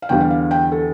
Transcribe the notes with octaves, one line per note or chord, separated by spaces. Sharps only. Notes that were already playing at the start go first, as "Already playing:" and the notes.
F5
E2 D3 G3 G5
F5
F5
G5
A4